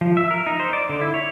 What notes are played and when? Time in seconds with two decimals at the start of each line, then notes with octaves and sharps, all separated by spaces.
0.01 F3
0.17 E5
0.31 A#4
0.47 D#4
0.60 C5
0.73 D5
0.89 D3
1.01 E4
1.14 C#5